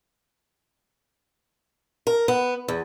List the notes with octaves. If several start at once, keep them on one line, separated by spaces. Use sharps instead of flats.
A#4
B3
E2